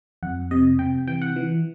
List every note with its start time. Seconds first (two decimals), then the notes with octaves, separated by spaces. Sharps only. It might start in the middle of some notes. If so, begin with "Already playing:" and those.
0.23 F2 F#5
0.51 C3 D#5
0.79 C3 G5
1.08 E3 G5
1.22 F#5
1.36 E3